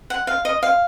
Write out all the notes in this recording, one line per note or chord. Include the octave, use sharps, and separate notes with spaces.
F#5
F5
D#5
F5